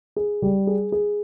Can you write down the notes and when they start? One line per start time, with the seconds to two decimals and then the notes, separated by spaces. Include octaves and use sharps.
0.16 G#4
0.42 G3
0.67 G#4
0.92 G#4